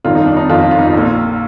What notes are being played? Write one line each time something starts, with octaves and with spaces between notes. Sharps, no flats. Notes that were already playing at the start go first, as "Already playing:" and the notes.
G1 F2 D#3 F4
D#4
D4
D#4
G1 F2 D#3 F4
F4
D#4
F4
A#1 A#2